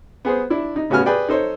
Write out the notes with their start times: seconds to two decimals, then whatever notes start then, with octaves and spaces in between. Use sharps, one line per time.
0.25 B3 G#4 C5
0.50 D4 E4
0.76 D#4
0.90 A2 C#3 B3 F#4 G#5 F6
1.06 G#4 B4 D5 G5
1.28 D#4 A4 C5 C#5